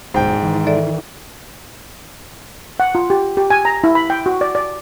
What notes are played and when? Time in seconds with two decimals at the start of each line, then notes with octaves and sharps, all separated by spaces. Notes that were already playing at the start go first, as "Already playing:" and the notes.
0.14 D1 G#2 B2 C5 G5
0.43 D#3 E3
0.67 A4 D5 E5
2.80 F#5
2.95 F4
3.10 G4
3.37 G4
3.50 G#5
3.65 A#5
3.84 E4
3.95 B5
4.10 G5
4.26 F#4
4.41 D5
4.55 D5